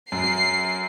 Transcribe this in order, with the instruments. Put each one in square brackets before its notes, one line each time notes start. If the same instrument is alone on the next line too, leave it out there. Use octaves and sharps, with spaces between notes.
[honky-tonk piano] F#2 [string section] C7